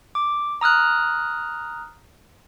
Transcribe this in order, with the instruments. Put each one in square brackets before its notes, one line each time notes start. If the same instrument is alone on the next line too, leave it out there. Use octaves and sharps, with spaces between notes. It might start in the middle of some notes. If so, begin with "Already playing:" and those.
[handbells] D6
A#5 D#6 F6 F#6